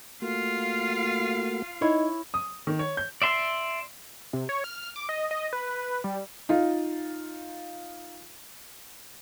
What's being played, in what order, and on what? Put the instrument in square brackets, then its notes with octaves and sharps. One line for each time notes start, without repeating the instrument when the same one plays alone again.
[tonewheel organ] A3 A#3 F#4 [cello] F4 F5
[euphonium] D#4 [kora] E4 C#5
[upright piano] D#6
D#3
C#5
G6
[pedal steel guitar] D5 E5 C6
[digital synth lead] C3
C#5
F6
D6
D#5
D#5
B4
G3
[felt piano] D#4 F4